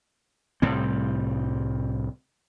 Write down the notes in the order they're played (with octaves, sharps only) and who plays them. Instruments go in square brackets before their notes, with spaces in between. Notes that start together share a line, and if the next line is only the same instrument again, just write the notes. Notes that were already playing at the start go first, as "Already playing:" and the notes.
[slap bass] C2 A2 G3 C4